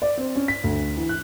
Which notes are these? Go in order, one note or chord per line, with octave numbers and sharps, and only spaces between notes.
D5
C4
C#4
B6
D2
E3
F#6